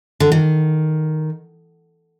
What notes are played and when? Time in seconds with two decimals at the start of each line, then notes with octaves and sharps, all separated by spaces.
0.20 D3
0.32 D#3